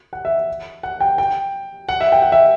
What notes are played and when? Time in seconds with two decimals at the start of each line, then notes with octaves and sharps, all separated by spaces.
0.13 F#5
0.25 E5
0.83 F#5
1.00 G5
1.18 G5
1.89 F#5
2.01 E5
2.12 G5
2.22 F#5
2.32 E5